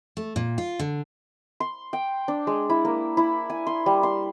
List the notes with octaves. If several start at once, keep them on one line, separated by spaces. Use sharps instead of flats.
A3
A#2
F4
D3
C6
G5
D4
G#3
E4
A#3
E4
G#5
C6
G3
C6